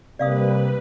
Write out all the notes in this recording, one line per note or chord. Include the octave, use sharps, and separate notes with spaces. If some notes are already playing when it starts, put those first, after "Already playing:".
C3 G3 A#3 B4 D5 F5 D#6